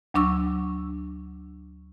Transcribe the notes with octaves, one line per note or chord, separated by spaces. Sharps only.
D2 F#3 D4 C#6 E6